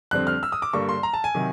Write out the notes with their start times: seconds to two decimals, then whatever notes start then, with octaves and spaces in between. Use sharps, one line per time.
0.11 F2 D3 G3 C4 F#6
0.27 F6
0.43 E6
0.52 D#6
0.62 D6
0.73 G2 D3 G3 A#3 C#6
0.89 C6
1.03 A#5
1.13 A5
1.24 G#5
1.35 C3 D#3 F#3